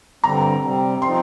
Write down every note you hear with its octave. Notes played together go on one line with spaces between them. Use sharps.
G2 D3 G3 C4 A#5
C3 G3 C4
F3 C4 D#4 C6